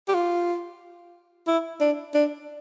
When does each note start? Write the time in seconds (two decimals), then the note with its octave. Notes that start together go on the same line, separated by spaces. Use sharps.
0.08 G4
0.14 F4
1.47 E4
1.81 D4
2.14 D4